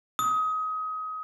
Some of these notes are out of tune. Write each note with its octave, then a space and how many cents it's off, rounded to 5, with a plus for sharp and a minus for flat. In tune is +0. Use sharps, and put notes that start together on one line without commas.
D#6 +25